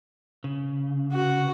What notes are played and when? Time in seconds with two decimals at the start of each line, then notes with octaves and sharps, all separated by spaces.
0.44 C#3
1.12 F#4 F#5